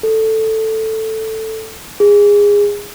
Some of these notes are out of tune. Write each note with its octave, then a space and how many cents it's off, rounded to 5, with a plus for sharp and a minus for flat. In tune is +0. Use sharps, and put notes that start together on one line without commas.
A4 +5
G#4 -20